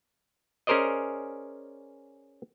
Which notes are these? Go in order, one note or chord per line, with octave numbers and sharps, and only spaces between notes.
C#4 G#4 A#4 C5 D5 D#5